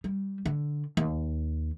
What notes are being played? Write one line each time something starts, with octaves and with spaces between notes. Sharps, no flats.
G3
D3
D#2